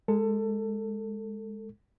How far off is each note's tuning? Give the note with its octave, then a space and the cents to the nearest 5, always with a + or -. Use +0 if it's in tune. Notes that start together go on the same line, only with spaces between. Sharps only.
G#3 +0 A4 +25